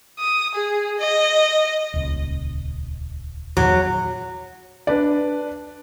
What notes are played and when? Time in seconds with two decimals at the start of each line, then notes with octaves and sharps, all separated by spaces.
0.20 D#6
0.55 G#4
0.99 D#5
1.94 D#1 C#2
3.57 E2 A#2 D#3 F#3
4.87 D4 B4 D5